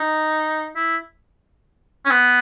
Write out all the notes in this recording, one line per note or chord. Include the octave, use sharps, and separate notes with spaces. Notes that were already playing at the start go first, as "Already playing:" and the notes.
Already playing: D#4
E4
C#4
B3